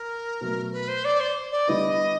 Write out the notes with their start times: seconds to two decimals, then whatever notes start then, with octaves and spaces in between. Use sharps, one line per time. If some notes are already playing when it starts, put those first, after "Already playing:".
Already playing: A#4
0.41 B2 F#3 A3
0.72 B4
0.88 C5
1.04 D5
1.20 C5
1.51 D5
1.68 D3 G3 B3 E4 D#5